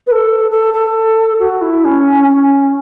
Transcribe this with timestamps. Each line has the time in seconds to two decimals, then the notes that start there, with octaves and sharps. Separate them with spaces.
0.07 B4
0.11 A4
0.51 A4
0.73 A4
1.39 F#4
1.61 E4
1.84 C#4
2.28 C#4